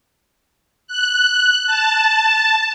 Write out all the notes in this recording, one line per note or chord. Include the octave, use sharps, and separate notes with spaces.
F#6
A5